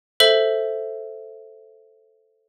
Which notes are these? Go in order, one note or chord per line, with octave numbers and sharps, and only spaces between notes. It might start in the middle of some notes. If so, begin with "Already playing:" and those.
A4 C5 E5 F#7